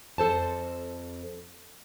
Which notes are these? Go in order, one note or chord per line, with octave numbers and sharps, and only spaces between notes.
F2 A4 C5 A5